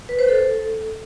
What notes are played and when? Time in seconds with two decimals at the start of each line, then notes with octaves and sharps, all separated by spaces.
0.09 B4
0.19 C5
0.28 A4